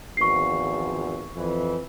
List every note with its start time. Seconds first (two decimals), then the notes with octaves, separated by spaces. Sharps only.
0.17 G#1 E2 F3 C#6 C7
1.36 F2 E3